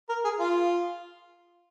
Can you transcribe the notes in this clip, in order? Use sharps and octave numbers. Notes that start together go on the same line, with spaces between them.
A#4
G#4
F4